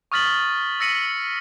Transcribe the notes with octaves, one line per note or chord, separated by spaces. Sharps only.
C#6 D#6 F6 A6 B6 F#7
E6 A#6 B6 C#7 D#7